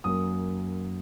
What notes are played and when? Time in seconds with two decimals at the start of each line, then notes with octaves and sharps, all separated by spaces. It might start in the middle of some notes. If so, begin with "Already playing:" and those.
0.04 F#2 F#3 A#3 D#6